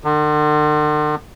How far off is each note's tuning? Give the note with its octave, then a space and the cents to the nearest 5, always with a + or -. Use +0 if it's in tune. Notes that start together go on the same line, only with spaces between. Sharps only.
D3 +45